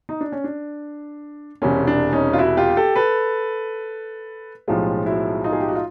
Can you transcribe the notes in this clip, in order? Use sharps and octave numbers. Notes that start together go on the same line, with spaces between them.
D#4
D4
C#4
D4
E1 E2 C3 C#4
D4
C#4 D#4
F4
E4 F#4
F4 G4
G4 A4
A4 B4
B1 A2 F3 G#3 F4 G4
E4 F#4
D#4 F4
G#4
G4
F#4
F4